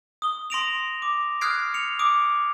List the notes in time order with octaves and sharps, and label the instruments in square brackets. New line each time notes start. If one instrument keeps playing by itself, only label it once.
[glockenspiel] D#6 G7
C6 D#6 A#6 D7 E7 F7
D6
D#6 F6 F#6 G#6 C7 D7
C#7 F7
D6 D#6 D7